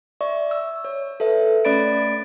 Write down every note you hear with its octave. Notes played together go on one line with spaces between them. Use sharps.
D5 E5 C#6
E6
C#5
A4 B4 E5
A3 C#4 D5 B5 A6 D7